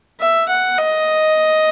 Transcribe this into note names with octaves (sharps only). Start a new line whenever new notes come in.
E5
F#5
D#5